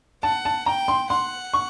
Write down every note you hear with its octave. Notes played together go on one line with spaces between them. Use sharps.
F#5 A5
A5
G5 A#5
C6
F#5 C6
C#6